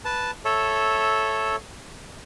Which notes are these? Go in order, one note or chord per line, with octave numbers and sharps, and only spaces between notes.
B4 A5
A4 C#5 E5